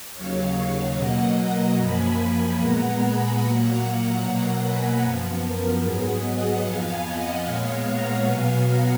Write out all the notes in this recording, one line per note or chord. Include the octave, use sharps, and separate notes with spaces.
D#2 C#3 F#3 C#5 F5
B2 F#3 A#3 D#5 F#5
F#5 A#5
F#2 F3 A#3 G#5 B5
G#5 B5
A#2 G#3 B3 F#5 A#5
G#5 B5
A#2 F#3 A#3 F#5 A#5
B2 F#3 A#3 F#5 A#5
G#5 B5
F#2 F3 B3
A#4
G#2 F#3 B3 G#4
D#5 F#5
F2 F3 B3 F5 G#5
D#5 F#5
A#2 G#3 B3 C#5 F5
F#5 A#5
B2 F#3 B3 F5 G#5
F#5 A#5